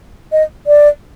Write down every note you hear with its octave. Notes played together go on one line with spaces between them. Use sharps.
D#5
D5